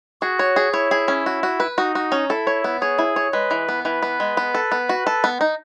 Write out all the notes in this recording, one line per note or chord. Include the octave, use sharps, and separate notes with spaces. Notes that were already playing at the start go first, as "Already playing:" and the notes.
F#4 G#4
C#5
G#4
E4 C#5
G#4
C#4
F#4
F#4
B4
D#4 F#4
F#4
C#4
E4 A4
C#5
B3
G#4 C#5
E4
C#5
G#3 B4
E3
B3
E3 B4
B3
G#3
B3
A4
B3
F#4
A4
B3
D#4